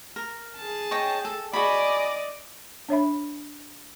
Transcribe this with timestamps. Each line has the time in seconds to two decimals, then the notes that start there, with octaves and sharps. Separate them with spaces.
0.16 A#4
0.57 G#4 A5
0.91 C#5 D#5 G5
1.25 A4
1.53 F#4 G#4 D5 D#5 B5
2.89 D4 C#5 E5 B5